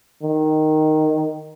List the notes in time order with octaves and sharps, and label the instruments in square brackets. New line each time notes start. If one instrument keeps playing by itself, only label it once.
[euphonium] D#3